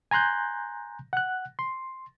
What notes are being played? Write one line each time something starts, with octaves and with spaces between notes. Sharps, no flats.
G#5 A#5 C6 F#6 G6
F#5 F#6
C6